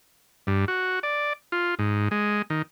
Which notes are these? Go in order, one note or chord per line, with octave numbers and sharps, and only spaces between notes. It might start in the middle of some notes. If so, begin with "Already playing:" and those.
G2
F#4
D5
F4
G#2
G#3
D#3